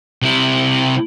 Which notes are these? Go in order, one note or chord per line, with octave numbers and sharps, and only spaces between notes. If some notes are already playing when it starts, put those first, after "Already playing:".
C3 E4